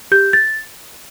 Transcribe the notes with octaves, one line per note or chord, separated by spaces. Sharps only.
G4 G6
A6